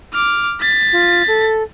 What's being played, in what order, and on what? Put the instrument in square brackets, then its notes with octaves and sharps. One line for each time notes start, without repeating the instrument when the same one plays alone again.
[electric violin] D6 F6
A6 B6
[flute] F4
A4